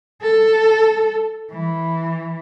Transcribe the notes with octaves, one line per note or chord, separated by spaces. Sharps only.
A4
E3